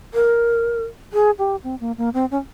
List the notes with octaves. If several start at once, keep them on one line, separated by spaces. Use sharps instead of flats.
A#4
G#4
G4
C4
A#3
A#3
C4
C#4